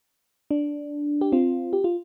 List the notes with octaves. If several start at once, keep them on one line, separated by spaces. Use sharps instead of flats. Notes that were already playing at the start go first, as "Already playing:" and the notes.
D4
G4
C4 F4
G4
F4